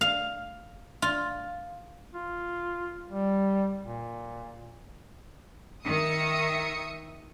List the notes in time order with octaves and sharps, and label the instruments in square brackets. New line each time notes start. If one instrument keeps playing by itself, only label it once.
[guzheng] F5
F4
[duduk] F4
G3
A#2
[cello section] D#3 [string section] E5 D#6 C#7